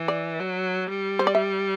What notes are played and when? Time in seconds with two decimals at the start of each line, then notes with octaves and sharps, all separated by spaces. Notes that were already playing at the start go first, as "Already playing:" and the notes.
Already playing: E3
0.08 D5
0.40 F#3
0.87 G3
1.19 C5
1.27 D5
1.35 E5